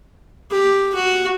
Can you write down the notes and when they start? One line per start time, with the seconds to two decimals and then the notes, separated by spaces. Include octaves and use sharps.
0.51 G4
0.94 F#4